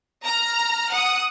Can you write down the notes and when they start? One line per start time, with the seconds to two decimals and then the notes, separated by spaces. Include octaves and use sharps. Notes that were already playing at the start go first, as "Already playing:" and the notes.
0.25 A#5 F6
0.91 F#5 D#6